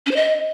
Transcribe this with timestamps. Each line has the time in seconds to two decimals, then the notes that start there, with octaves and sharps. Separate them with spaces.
0.06 C#4
0.11 C5
0.16 D#5